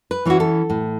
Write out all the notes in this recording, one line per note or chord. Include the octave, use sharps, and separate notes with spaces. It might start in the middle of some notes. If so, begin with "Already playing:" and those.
B4
E3 C#4 E4 F#4
A4
A2